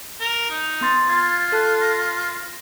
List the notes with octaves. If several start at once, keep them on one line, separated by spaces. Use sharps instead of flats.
A#4
D#4
B3 C6 A6
F4 G#6 A6
A4 A5 F#6
A#6